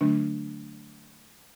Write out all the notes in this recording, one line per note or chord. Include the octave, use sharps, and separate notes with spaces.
D3 F#3 A3 D4